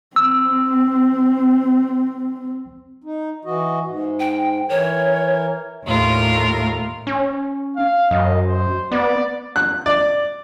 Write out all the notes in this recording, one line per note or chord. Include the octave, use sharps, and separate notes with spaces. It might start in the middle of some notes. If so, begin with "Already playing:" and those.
C4 E6
D#4
E3 F#4 D#5
G#2
G5
E3 A#4 C#5
D#2 A2 F4 A#4
C#4
F5
F#2 D#5
C5
B3 D5
F#6
D5